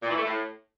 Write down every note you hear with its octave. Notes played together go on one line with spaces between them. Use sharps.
A#2
E3
A3
A2